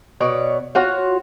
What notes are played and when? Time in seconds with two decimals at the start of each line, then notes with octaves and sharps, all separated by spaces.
0.21 B2 C#5 D5
0.75 F4 F#4 C#5